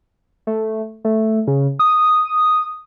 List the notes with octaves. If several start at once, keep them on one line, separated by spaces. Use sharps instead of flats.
A3
A3
C#3
D#6